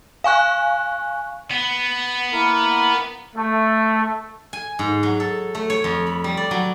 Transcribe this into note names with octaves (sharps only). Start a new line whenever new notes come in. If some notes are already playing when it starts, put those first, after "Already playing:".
F5 G#5 C#6 F#6
B3
A#3 E4 A#4
A3
G#5
G#2
F#3
A4
A3
C#5
F2
B5
G3
D5
F#3